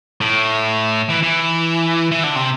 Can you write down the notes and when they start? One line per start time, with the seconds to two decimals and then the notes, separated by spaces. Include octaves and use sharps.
0.21 A2
1.10 E3
1.23 E3
2.12 E3
2.24 D3
2.36 C3